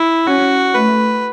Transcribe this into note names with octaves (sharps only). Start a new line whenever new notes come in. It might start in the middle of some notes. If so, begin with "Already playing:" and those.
Already playing: E4
C#4 F#4
A3 B4